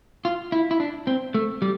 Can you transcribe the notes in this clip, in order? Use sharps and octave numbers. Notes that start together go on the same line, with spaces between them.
F4
E4
E4
D4
C4
A3
G3